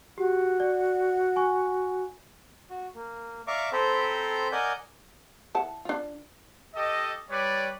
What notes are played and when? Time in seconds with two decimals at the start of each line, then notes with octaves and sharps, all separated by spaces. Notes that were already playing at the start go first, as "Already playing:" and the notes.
0.18 F#4 G4
0.60 D5
1.36 G#5 C#6
2.70 F#4
2.95 A#3
3.47 D5 E5 F5 A#5 C#6 D6
3.72 C4 A4 C5 G5 A#5 B5
4.52 A#4 D5 D#5 F#5 G#5 G6
5.55 E4 F#5 A5
5.85 D4 F4
6.75 G4 A4 D#5
7.30 G3 B4 C#5 D5